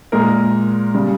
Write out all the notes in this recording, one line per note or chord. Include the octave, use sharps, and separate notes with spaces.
A#2 G#3 A#4
C#3 G3